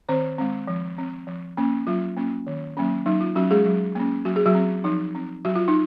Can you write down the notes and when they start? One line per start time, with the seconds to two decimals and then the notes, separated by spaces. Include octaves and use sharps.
0.09 D#3 C4 C5
0.38 G#3 C4
0.67 F3
0.98 C4
1.27 F3
1.57 A#3 C#4
1.87 F#3 F4
2.16 A#3 C#4
2.47 D#3
2.77 F#3 A#3 C#4
3.06 F#3 D#4
3.21 F4
3.35 F#3 C#4 F#4
3.51 G#3 G#4
3.65 F#3
3.95 A#3 C#4
4.25 F#3 F#4
4.36 G#4
4.46 F#3 F#4
4.55 C4
4.84 F3 D#4
5.15 C4
5.45 F#3 F#4
5.55 F4
5.68 D#4